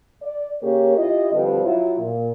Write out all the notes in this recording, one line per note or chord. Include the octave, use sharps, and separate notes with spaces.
D5
C#3 A#3 G4 A#4 C#5
E4 F4 G4 D#5
B2 D3 F3 G3 C4 B4
F#3 E4 F4
A#2